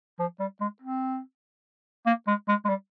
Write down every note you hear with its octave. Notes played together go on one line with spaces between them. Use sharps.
F3
G3
G#3
C4
A#3
G#3
G#3
G#3
G3